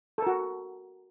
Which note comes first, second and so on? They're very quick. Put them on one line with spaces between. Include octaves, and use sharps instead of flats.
A4 A#4 F#4